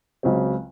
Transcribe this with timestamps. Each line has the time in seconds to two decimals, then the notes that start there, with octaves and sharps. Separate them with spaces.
0.23 C#2 C#3 F#3 C4